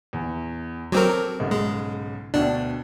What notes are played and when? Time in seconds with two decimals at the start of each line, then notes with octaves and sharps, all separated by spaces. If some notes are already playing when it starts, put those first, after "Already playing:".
0.13 E2
0.92 F#3 C4 A4 A#4 D6
1.39 B1 G#2 C#3
1.51 G#3
2.34 D2 B2 D4 G5